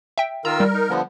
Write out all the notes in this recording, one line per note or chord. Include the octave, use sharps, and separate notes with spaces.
E5 G5
D#3 F4 A#4 A#5 E6
G3
D#4
D3 F3 B3